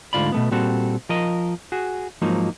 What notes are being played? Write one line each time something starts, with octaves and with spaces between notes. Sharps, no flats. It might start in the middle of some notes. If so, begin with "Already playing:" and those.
D2 G#2 D3 F4 D5 B5
B2 A3 B3
A#2 G3 C4 F#4 A4
F3 A#4 D#5
F#4 G#4
G#2 F3 F#3 A#3 D#4